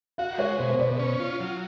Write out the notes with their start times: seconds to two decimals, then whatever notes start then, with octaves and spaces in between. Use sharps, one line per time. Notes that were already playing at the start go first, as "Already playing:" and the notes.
0.18 F#4 F5
0.38 G#3 C#5
0.58 B2 C5
0.69 C5
0.79 B2 D5
0.89 C5
0.99 C#4
1.20 F4
1.40 F#3